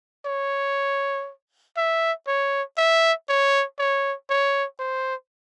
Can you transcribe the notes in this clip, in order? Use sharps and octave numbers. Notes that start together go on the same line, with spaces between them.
C#5
E5
C#5
E5
C#5
C#5
C#5
C5